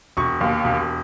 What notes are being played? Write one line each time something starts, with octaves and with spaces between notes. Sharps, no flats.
E1 C#6
D#2
E1